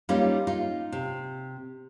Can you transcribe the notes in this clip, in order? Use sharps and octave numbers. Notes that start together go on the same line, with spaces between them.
G3 A#3 C#4 D#4 F4
D#4 F4
C3